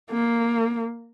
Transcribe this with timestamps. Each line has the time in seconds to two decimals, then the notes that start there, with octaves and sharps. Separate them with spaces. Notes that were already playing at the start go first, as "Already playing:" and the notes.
0.11 A#3